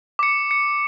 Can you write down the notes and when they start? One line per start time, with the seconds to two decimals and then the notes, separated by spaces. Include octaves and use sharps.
0.19 D6 C#7
0.51 C#7